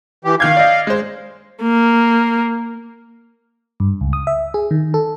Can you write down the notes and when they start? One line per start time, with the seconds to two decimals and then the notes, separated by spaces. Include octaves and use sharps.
0.24 E3 G4
0.40 D#3 F5 G6 G#6
0.57 D5 D#5
0.87 G#3 C5
1.62 A#3
3.80 G2
4.01 C#2
4.13 D#6
4.27 E5
4.54 G#4
4.71 D#3
4.94 A4